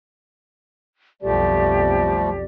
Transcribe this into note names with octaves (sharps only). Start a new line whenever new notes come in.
B1 F2 F3 G3 A3 G4 D5